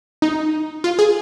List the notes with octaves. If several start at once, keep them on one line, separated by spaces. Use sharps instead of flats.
D#4
F4
G#4